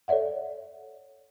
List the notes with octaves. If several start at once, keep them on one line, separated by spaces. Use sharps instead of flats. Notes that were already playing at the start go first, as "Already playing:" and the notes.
A4 C#5 D5 E5 F#5